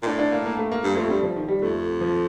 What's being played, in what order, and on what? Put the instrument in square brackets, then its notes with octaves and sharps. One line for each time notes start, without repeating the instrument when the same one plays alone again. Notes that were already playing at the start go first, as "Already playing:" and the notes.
[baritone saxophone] A#2
[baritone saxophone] A2 [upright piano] D4
[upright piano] D4
A#3
A#3
A3
A#3
[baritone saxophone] G2
[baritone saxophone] F2 [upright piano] A3
[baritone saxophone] G2 [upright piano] G3
[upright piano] F3
D#3
G3
[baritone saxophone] F2 [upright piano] A3
[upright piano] F3